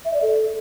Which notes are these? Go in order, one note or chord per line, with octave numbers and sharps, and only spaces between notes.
E5
D5
A4